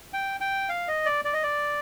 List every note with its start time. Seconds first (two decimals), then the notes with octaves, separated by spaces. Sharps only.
0.13 G5
0.40 G5
0.69 F5
0.88 D#5
1.06 D5
1.25 D5
1.34 D#5
1.43 D5